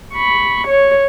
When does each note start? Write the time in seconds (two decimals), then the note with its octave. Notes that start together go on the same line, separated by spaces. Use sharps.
0.14 B5 C#6
0.67 C#5